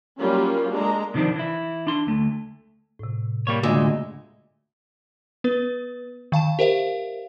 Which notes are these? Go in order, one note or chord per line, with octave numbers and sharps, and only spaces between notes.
F#3 G3 A#3 C#4 F4
G#3 A#3 D4 A4 A#5
C3 D#3 F3 C4 D4
E3 E4
D4 C6
D2 A3
A2 C3
G3 A#3 C#5
D2 A#2 C#3 G#3 E6
B3 B4
D#3 F5 A5 E7
G4 A#4 C5 E5 F5